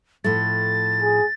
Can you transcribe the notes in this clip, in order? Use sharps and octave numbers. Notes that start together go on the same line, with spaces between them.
A2 F3 A3 A6
G#4